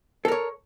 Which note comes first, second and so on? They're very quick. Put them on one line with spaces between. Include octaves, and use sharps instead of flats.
A4 A#4 C#5